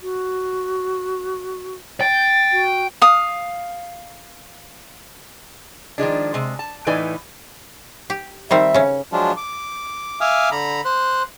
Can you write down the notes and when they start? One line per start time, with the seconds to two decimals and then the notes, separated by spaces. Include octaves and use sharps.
0.01 F#4
2.01 G5 A6
2.52 F#4
3.02 F5 D#6
5.98 D#3 F3 G#3 D4
6.34 C3 G#3
6.59 A5
6.87 A2 E3 D#4 B4 D5 G#5
8.10 G4
8.51 D#3 G3 C4 E5
8.74 C#3 C#4
9.12 F3 F#3 G#3 D4 F4
9.37 D6
10.21 E5 F5 G#5 D6 D#6 F6
10.51 D3 A#5 B5
10.85 C5 C6 F#6